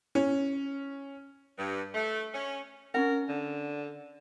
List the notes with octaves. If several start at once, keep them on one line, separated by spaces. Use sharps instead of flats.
C#4
G2
A3
C#4
C#4 D#4 A#4 F#5
D3